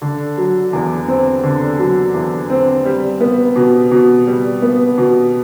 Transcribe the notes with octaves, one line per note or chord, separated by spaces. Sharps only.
D3
F#3
E2
C4
D3
F#3
E2
C4
G3
B3
B2
B2
G3
B3
B2